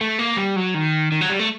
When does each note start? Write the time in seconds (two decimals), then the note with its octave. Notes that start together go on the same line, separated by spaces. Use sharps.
0.01 A3
0.19 A#3
0.37 G3
0.56 F#3
0.74 D#3
1.12 D#3
1.21 F#3
1.30 G3
1.39 A3